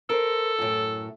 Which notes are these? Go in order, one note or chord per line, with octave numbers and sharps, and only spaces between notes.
A4 A#4 C5
F#2 A2